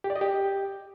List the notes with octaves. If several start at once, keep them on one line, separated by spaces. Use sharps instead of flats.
G4
D5
D#5
G4